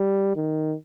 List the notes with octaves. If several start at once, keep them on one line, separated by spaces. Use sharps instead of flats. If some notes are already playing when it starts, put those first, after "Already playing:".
Already playing: G3
D#3